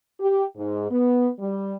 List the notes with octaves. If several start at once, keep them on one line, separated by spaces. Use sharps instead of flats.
G4
G#2
B3
G3